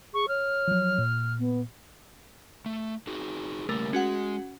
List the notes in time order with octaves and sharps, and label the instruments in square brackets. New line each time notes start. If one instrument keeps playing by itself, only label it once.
[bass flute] G#4 [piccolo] C#6
[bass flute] C#5 [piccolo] F6
[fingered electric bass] F3 F#3
A#2
[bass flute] B3
[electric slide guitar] A3
D#4 F#4 G#4
[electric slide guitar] C#3 G3 A#3 [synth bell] A3 A#4
[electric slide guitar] G#3 [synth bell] C#4 F#4 F#5